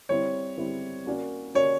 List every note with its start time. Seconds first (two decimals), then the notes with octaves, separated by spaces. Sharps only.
0.09 G3 C4 E4 C#5
0.58 G3 C4 E4
1.06 A#3 C#4 F#4 A#4 D5
1.55 A#3 C#4 F#4 A#4 C#5 D5